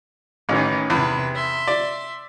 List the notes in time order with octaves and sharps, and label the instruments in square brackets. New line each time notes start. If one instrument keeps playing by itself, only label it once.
[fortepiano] A1 [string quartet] D#3 E3 C#4
[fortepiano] E2 [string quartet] C3 B4
[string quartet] E5 C6
[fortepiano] D5